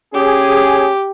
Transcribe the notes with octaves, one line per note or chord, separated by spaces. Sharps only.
C#4 G4 G#4